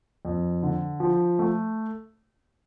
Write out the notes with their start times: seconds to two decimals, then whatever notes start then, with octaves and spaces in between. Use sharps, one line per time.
0.25 F2
0.63 D3
1.00 F3
1.39 A3